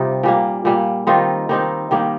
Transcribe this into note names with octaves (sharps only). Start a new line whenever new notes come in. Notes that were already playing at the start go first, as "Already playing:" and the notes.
Already playing: C3 G3 D#4 F4
A#2 G3 A#3
A#2 G3 A#3
D#3 G3 C4 D#4 F4
D#3 G3 C4 D#4
D#3 G3 A#3 D#4